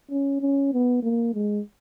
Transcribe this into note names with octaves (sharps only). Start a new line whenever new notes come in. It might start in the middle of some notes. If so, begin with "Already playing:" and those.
C#4
C#4
B3
A#3
G#3